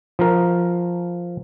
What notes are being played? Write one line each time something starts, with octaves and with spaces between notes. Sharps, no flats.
F3 A#4